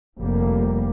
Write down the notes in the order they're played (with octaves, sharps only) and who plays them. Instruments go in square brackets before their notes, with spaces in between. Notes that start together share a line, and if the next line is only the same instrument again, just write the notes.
[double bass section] F1 G3 A#3